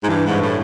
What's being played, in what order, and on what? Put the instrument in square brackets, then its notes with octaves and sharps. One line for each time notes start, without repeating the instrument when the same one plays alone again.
[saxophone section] G#2
[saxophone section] G2 [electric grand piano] E3
[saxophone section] G#2
[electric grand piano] G2
[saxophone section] A2